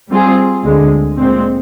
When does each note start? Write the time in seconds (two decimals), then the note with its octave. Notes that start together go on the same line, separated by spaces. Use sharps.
0.10 G3 C4 F4 G#4
0.64 D2 D3 G#3
1.19 A#2 G#3 C4